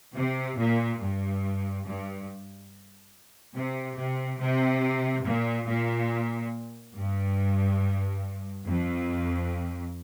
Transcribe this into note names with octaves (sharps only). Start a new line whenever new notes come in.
C3
A#2
G2
G2
C3
C3
C3
A#2
A#2
G2
F2